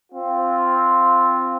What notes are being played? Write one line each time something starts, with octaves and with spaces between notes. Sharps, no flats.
C4 F4